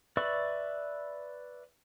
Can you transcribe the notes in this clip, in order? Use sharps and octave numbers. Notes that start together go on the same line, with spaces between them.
B4 D5 E5 C#6